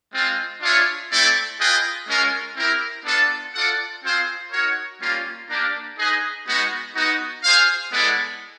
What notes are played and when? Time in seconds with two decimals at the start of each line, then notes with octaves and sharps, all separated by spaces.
0.13 G#3 C4 F4
0.61 D4 F4 G#4 C#5 E5
1.11 A3 C4 E4 A4 D5
1.59 F4 G#4 B4 D#5 G5
2.08 G#3 C#4 F4 A#4
2.56 C4 E4 G4 A#4
3.05 B3 D4 F4 A4
3.54 F4 A4 D5 F#5
4.03 C4 F4 G#4 C5 F5
4.52 D#4 F#4 A#4 C#5
5.00 G3 A#3 C#4 F4
5.49 A#3 D4 G4 A#4
5.98 D#4 G#4 B4 D#5
6.47 G#3 B3 D#4 F#4
6.95 B3 D#4 F#4
7.44 F4 G#4 C5 F5
7.92 G#3 B3 E4 A4 D5